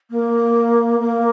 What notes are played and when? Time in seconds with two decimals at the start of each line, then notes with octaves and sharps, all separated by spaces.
0.11 A#3
1.00 A#3